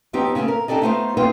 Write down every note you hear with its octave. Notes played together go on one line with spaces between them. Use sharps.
D#2 F3 B3 C4 D#4 G4
C#3 A3 B3 C#4
A#4
D4 D#4 G4 A4 D5 D#5
A3 B3 D#4 F4 B4 C5
G#3 B3 C4 D#4 F4 B4